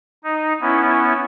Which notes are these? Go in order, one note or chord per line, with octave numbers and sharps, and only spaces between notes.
D#4
B3 C#4 E4